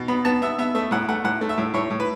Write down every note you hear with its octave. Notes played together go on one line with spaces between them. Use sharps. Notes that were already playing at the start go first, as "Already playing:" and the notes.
Already playing: B2
B3 B5
B3 A5
B3 E5
B3 E5
A3 E5
A2 F#5
A3 F#5
A2 F#5
A3
E5
A2
A2 C#5
A2
B4